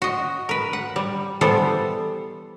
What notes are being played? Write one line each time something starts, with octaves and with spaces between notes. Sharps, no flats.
F#4 D#5
A#4 B4
F#5
G3
E3 G3 B3 A4 C5